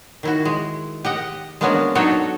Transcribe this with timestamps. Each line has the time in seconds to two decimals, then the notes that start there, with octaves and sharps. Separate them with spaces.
0.23 D#3 E4 F#4
0.45 G#3
1.05 G4 D#5 F#5
1.61 G#3 A#3 B3 C#4 D4 F#4
1.95 F#3 D4 D#4 F#4 A4 C#5